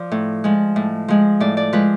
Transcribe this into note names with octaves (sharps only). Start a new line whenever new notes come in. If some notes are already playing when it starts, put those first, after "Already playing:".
Already playing: F3 D5
A2
F3 G#3
A2
F3 G#3
A2 D5
D5
F3 G#3 B4